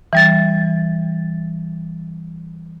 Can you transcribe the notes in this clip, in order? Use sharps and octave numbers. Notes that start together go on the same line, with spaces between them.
E3 G3 A6